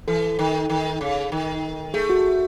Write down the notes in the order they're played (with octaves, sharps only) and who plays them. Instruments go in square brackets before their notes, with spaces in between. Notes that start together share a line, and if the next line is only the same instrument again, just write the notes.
[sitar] E3 [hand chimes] A4
[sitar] D#3
D#3
C#3
D#3
[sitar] A3 [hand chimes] G#4
[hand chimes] F#4